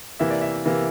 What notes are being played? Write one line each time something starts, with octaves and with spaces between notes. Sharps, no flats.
C3 E3 A#3 E5
D5
E5
C3 E3 A#3